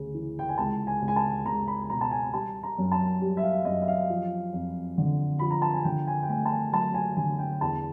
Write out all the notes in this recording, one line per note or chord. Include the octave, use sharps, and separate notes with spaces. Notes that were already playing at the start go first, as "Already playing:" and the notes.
Already playing: D2 C#3
E3
G5
G#5
C#2 A5
G#5
C#2
G#5
A5
C#2 A#5
B5
B2 A#5
A5
G#5
G3 A5
A#5
F#2
A5
G3
E5
F5
F#2 D#5
E5
F5
F3
F2
D3
F3 B5
A#5
A5
G#5
D3 G5
G#5
G5
A3 G#5
A5
G#5
F#3 A5
G#5
D3 G#5
G5
E2 A5